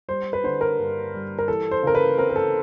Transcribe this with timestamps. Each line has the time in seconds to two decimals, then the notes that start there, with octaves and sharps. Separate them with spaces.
0.08 G3 C5
0.33 B4
0.44 D3 C5
0.61 A#4
0.79 G2
1.14 G3
1.39 A#4
1.48 E3 A4
1.71 C5
1.83 C#3 A#4
1.95 B4
2.18 C4 A#4
2.30 A#4
2.36 A4